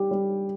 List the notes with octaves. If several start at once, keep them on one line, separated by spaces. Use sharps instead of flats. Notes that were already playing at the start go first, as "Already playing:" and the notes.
Already playing: G3 G4
G3